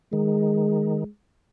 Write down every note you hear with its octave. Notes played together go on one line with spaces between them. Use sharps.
D#3 G#3